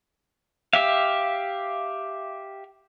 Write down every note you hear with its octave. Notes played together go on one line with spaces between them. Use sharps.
G4 E5 F5